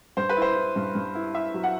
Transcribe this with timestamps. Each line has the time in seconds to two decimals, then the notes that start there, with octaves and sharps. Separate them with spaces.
0.17 G2 C5
0.29 B4
0.37 E4
0.42 C5
0.56 E4
0.76 G2
0.95 G2
1.15 E4
1.34 E4 E5
1.54 F#3
1.63 F#5